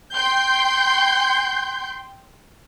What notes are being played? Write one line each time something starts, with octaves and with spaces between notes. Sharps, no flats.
G5 C6 G6